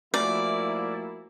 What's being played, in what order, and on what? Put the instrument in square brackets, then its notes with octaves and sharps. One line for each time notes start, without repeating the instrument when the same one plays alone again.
[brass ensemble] F3 A#3 E4 [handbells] A3 F#4 G#5 [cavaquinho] D5